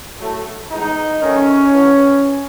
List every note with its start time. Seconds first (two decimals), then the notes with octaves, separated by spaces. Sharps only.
0.19 A2 F#3 A3
0.71 A2 E3 G#3 B3 D#4
1.21 F#2 D#3 A3 C#4
1.71 A2 E3 B3